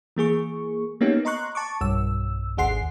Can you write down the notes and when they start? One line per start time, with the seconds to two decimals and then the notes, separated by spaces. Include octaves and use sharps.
0.17 E3 A#3 G#4 C#6
1.01 A#3 B3 C#4 D#4 G4
1.25 D#5 A#5 C6 C#6 F#6
1.55 A5 C#6 D6
1.81 B1 G2 E6
2.57 G#1 D#2 G#4 F#5 C6 C7